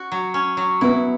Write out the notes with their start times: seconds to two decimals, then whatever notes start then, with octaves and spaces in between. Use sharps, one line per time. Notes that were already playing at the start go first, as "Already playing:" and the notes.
Already playing: C#4 F#4
0.12 F#3
0.34 C#4
0.57 F#3
0.81 B3 E4